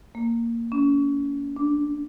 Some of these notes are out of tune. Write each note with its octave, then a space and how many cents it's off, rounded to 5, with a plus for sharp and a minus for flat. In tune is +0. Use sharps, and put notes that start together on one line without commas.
A#3 -10
C#4 +35
D4 +0